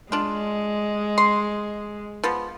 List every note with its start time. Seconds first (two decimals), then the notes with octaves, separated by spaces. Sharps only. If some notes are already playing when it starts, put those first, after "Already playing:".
0.12 G#3 D4 F4
1.18 C6
2.23 F3 B3